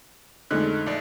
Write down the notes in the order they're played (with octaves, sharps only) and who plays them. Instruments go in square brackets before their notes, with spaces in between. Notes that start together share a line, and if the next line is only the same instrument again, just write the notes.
[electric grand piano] F2 D3 F#6 [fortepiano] G#3 A3 D#4
[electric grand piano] A#1 D5